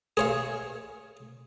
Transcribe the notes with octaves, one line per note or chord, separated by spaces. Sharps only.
G#4 C#5 F5